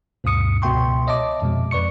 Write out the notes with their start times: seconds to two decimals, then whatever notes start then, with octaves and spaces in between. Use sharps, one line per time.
0.24 D2 G2 B2 D#6 C#7
0.62 C#2 B2 E5 G5 C6 C#6
1.07 C#5 D#5 E5 A5 D6
1.42 F2 B2 G#3
1.71 F2 B4 D5 C#6 C#7